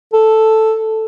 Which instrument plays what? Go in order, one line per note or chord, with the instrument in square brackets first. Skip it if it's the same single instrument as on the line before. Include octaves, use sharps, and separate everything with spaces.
[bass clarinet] A4